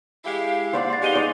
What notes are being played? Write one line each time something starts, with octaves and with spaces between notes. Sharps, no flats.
G#3 E4 G4 F5
C5 D5 F#5
C6 A6
G#3 B3 D#4 G4 D#7 G7
D5